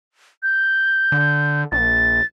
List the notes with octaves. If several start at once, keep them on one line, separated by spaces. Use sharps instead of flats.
G6
D3
A#1 A6